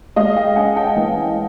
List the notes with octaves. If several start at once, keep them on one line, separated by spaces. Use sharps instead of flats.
G#3 D#5 F5
F5 G5
C#4 F#5 G#5
G5 A5
E3